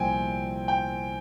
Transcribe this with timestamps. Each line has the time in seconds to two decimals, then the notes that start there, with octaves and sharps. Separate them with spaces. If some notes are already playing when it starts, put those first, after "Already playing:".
Already playing: C2 A#2 F3 C4 G5 G#5
0.68 G5